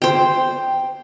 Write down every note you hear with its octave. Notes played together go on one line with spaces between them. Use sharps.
C5 G5